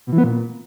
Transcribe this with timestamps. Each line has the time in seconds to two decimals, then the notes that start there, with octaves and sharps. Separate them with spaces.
0.07 B2
0.13 E3
0.18 B3
0.24 A#2